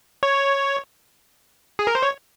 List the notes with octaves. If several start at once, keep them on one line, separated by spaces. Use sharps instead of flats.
C#5
G#4
A#4
C5
C#5